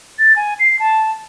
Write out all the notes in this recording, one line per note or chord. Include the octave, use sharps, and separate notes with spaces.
A6
G#5
C7
A5